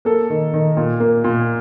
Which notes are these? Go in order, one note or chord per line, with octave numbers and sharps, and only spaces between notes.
A#3 A4
D#3
D#3
A#2
A#3
A#2